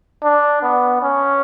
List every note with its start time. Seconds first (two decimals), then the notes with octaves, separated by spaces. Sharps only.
0.23 D4
0.63 B3
1.02 C#4